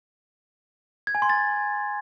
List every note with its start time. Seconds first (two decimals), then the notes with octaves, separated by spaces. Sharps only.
1.07 G#6
1.15 G#5
1.22 C6
1.30 A6